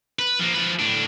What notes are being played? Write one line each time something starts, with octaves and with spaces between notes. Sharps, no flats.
B4
F3 A#3
F3 B4
A2 D4